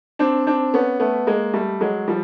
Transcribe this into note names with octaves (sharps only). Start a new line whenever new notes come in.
C4 D4
C4 D4
B3 C#4
A3 B3
G#3 A#3
G3 A3
F#3 G#3
F3 G3